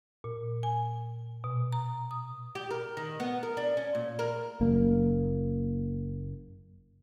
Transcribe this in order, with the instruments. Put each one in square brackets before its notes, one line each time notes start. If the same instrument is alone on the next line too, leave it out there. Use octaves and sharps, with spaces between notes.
[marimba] A#2
G#5
B2
A#5
D#6
[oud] G4
A#4
D#3
B3
A#4
D4
C#4
A#2
A#4
[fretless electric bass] F#1 A#3